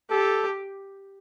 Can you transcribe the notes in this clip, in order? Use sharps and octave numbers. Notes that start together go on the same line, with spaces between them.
G4 A4